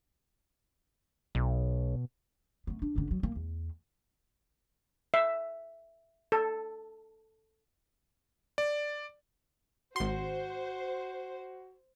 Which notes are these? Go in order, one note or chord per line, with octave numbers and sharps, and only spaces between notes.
B1 B2
A3 B3
D4
F#1 D3
F#3
A#3
E2
E5
A4
D5
G#1 F#4 C5 C6